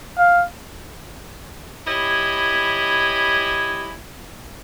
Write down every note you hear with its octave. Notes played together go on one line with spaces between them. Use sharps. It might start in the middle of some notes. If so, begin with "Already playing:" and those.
F5
E4 G4 C#5 D#5 G#5 B5